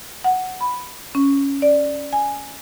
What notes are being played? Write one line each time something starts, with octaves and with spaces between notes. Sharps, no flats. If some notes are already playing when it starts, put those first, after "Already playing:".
F#5
B5
C#4
D5
G#5